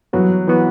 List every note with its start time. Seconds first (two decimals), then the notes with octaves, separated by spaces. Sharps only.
0.13 G2 E3 F#3 B3 F#4
0.48 E3 B3 F#4